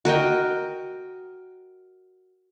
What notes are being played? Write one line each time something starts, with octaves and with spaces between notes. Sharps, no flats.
F#4 A#4 D#5 G5